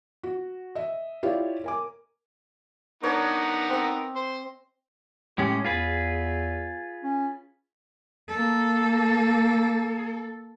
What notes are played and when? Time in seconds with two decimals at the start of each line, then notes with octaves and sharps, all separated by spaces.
0.23 F#4
0.75 D#5 E5
1.23 E4 F4 G4 C#5 D5
1.64 A#4 G#5 D6
3.04 B3 D4 D#4 A#4 C#5
3.70 C4 D#5
4.16 C5
5.38 A2 G#3 C#4 G4
5.65 E2 F4 G#4 B4
7.04 C#4
8.29 A#3 A4